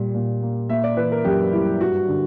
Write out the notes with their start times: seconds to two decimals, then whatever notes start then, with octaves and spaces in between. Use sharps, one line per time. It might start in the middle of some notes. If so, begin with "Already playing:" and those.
Already playing: A#2 G3
0.15 A#2
0.43 A#3
0.69 A#3 E5
0.84 D5
0.97 E3 B4
1.12 A#4
1.25 F#2 G4
1.52 G3 E4
1.81 G2 F#4
2.08 D3